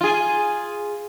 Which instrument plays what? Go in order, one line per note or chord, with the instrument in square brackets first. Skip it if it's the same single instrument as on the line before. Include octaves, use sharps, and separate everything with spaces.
[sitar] F4 G#4